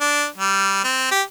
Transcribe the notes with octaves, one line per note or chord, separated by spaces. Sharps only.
D4
G3
C4
G4